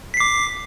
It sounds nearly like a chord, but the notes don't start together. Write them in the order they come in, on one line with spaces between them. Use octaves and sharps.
B6 C7 D6